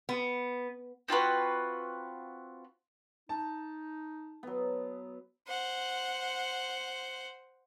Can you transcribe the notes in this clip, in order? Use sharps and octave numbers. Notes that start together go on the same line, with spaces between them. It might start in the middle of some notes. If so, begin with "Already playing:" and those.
B3
C4 F4 F#4 B4
D#4 A5
F#3 B3
C5 F#5